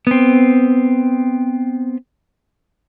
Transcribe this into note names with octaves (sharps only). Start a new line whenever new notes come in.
B3 C4